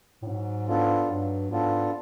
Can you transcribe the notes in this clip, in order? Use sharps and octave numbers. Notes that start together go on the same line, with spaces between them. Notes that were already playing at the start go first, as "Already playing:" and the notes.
A2
G#2 F#3
B3 D4 F4 A4
G2 F#3
G#2 B3 D4 F4 A4